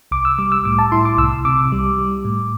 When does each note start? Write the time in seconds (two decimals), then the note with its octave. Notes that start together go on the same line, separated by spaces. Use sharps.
0.11 C2 D6
0.25 E6
0.38 G3 D6
0.52 E6
0.65 A2 D6
0.79 A5
0.92 E4 C6
1.05 D6
1.18 C2 E6
1.45 C3 D6
1.72 G3
1.98 G3
2.25 A2